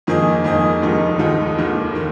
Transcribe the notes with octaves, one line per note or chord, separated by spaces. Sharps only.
F2 D#3 A#3 G#4 D#5
F2 D#3 A#3 G#4 D#5
F1 D#2 D#3 G#3 D#4
F1 D#2 D#3 G#3 D#4
F1 D#2 D#3 A#3
D#3 A#3